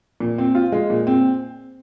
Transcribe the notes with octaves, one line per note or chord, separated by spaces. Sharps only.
A#2
C4
F4
G#3
A#2
C4